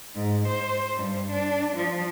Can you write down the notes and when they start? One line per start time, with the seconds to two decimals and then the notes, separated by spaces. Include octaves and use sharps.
0.15 G#2
0.48 C5
0.96 G2
1.31 D4
1.75 F3